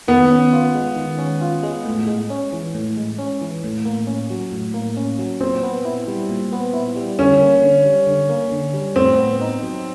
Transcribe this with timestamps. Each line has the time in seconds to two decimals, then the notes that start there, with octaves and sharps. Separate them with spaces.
0.08 D#3 B3
0.31 C#4
0.53 F4
0.75 G#3
0.96 D#3
1.18 C#4
1.41 F4
1.63 G#3
1.85 A2
2.07 G#3
2.30 C#4
2.53 E3
2.74 A2
2.97 G#3
3.18 C#4
3.42 E3
3.64 A2
3.85 A#3
4.07 C#4
4.30 F#3
4.52 A2
4.74 A#3
4.97 C#4
5.19 F#3
5.40 A#2 C4
5.63 B3
5.85 E4
6.08 G3
6.29 A#2
6.52 B3
6.73 E4
6.96 G3
7.19 D3 C#4
7.40 A#3
7.63 D3
7.85 G3
8.07 D3
8.29 A#3
8.52 D3
8.74 G3
8.96 A2 C4
9.18 B3
9.41 D#4
9.63 F#3